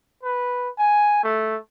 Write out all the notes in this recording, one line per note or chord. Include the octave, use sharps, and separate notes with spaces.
B4
G#5
A3